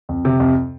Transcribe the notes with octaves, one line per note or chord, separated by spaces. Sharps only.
F2
C3
F2